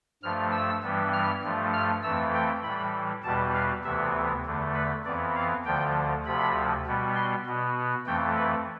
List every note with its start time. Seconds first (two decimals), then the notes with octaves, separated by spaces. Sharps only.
0.23 G2 F3 A3 F6
0.52 E6
0.83 G2 E3 G3 B3
1.13 F6
1.43 G2 F3 A3
1.73 F6
2.03 F2 E3 A3 E6
2.34 G5
2.63 A2 E3 G3 B5
3.24 E2 B2 G3 B3 A5
3.54 F5
3.84 D2 C3 E3 B3 E5
4.45 E2 D3 A3
4.74 B4
5.05 F2 E3 B3 D5
5.35 F5
5.65 D2 D3 F3 G5
6.25 D2 C3 F3 B5
6.86 B2 G3 B3
7.16 C6
7.46 B2 B3
8.06 F2 E3 A3 G5
8.36 B4